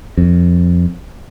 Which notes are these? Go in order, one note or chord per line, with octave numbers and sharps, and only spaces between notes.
F2